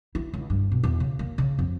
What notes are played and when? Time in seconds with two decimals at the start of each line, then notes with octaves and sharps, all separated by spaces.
0.15 E4
0.34 C#2
0.50 G2
0.72 B2
0.83 E2
1.00 C#3
1.19 A#3
1.38 C#3
1.59 F2